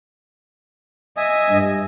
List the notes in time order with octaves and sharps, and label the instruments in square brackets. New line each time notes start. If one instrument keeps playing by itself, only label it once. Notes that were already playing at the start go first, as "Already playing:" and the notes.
[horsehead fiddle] D#5 [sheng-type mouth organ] E5 G#5 D#6
[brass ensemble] G2